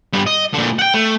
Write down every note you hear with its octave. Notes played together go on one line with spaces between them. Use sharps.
G2 B3
D#5
A#2 D3
F#5 G5
A3